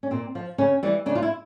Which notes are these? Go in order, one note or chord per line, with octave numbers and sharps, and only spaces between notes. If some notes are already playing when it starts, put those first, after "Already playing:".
C#4
A#2 C4
F3
C#3 C#4
E3 G3
C#3 D4
F4
E4